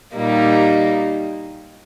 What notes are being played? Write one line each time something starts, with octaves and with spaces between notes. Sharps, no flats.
A#2 G3 A#3 D#4